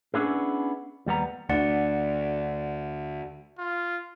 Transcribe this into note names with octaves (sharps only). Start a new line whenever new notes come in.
B3 C#4 D4 E4 G#4
D#2 G3 B3 A#5
D2 D5 F#5
F4